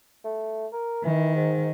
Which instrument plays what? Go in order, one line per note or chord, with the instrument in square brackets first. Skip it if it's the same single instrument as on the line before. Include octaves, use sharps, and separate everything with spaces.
[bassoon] A3
A#4
[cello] D#3 [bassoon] E3
[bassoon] G#2